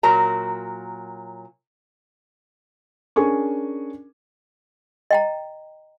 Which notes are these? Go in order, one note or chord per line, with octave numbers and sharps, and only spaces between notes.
A#2 F#3 A#4 A#5
C#4 D4 G#4 A#4 G#5 C#6
D#5 G5 A#5